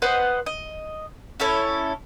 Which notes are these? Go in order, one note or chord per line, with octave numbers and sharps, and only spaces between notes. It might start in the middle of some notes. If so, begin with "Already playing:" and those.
B4 C5 D#5 F#5
D#5
C#4 E4 A4 C#5